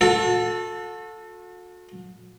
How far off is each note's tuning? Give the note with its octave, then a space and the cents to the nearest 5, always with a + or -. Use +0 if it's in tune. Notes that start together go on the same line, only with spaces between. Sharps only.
F#4 -40 A4 +0